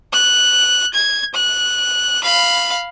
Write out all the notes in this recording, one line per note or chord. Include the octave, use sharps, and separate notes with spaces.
F#6
G#6
F#6
F5 B5